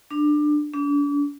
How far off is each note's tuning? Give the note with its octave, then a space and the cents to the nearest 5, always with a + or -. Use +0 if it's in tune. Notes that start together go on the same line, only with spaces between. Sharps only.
D4 +20
D4 -40